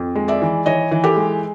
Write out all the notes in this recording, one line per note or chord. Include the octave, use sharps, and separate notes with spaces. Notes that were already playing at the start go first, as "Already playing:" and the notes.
Already playing: F2
G#3
D5 E5
E3
E3 C#5 D#5
E3
G4 A4
G#3